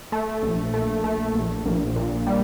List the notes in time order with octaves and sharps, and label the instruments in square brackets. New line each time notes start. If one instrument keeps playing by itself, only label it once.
[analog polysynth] A3
A#1
A3
A3
A#1
A#1
A#2
G3